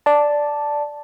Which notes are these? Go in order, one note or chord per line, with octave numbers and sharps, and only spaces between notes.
D5 A5